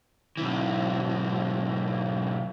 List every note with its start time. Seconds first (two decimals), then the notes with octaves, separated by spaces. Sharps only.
0.37 B1 E3